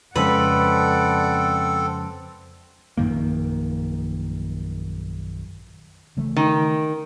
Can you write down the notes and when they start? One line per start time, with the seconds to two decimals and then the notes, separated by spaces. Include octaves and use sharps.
0.16 F2 C#3 G#3 C4 A4 B4 D5 F#5
2.97 A#1 F#2 D#3 A#3
6.17 C#3 E3 A3
6.36 D#3